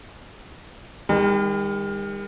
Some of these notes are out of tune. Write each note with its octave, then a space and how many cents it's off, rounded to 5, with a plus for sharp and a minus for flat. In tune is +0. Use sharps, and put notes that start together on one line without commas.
D#3 +0 G3 +45